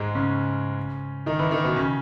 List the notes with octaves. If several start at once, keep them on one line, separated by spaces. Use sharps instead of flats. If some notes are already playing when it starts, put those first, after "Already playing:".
Already playing: G#2 G#3
C#3 C#4
D#3 D#4
E3 E4
D#3 D#4
B2 B3
C#3 C#4